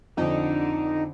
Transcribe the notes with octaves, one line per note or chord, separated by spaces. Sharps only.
F2 D3 D#4